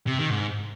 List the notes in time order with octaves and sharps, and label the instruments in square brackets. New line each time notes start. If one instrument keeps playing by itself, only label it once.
[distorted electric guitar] C3
D#3
G#2